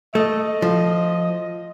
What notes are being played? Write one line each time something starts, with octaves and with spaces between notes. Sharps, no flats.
A3 D#5
F3